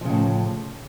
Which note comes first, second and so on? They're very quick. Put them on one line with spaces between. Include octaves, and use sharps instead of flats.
F3 C#3 A2